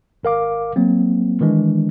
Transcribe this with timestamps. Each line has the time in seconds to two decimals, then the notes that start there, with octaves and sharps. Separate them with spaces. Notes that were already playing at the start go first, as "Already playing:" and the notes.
0.23 G#1 A#4 F5 D6
0.76 F#3 A#3 C4
1.41 D#3 E3 G#3 D4